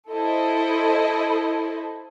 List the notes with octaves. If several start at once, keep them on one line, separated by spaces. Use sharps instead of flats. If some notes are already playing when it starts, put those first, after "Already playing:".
E4 A4 C5 D#5